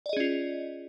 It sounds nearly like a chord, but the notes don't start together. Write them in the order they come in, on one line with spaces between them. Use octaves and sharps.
D5 D#5 G#4 C#4 F4